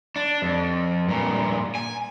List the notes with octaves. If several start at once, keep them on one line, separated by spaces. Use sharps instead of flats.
D4
F2
G2 A#2
G#5